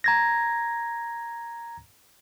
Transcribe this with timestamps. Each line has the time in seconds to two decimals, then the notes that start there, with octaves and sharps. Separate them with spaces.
0.04 A#5 G#6 A#6